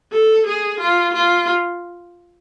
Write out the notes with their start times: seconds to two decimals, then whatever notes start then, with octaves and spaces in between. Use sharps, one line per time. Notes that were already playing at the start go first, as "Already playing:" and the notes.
0.12 A4
0.46 G#4
0.79 F4
1.13 F4